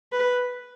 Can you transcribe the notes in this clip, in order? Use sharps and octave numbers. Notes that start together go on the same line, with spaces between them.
B4